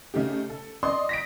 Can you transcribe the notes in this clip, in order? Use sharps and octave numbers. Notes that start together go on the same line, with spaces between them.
C#3 A3 D#4 G4
A4
D5 D#5 C6 D#6
A#6 B6 D7